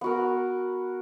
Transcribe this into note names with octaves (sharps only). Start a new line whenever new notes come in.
B3 F#4 A#4